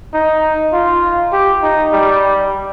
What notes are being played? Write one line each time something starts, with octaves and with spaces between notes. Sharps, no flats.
D#4
F4
G4
D#4
G3